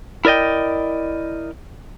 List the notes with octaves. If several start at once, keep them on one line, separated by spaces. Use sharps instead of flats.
E4 A#4 D5 D#5 G5